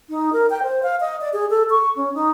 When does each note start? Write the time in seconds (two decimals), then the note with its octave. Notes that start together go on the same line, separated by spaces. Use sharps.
0.10 D#4
0.33 A#4
0.50 G5
0.63 C5
0.83 F5
1.01 D#5
1.21 D5
1.33 G#4
1.50 A4
1.70 C#6
1.96 C#4
2.14 D#4